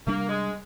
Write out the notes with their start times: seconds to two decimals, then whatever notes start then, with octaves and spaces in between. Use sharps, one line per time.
0.07 C3 G3 A#3 D4
0.29 G#3